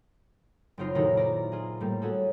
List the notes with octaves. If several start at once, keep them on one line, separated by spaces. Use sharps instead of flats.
F#1 C#3 C4 D#4 F4 C7
A#2 D#3 D#4 E4 F#4 A4
E4 F4 D5 A#5
F4 G#4
A2 G3 A#3
C#4 F#4 G#4 A4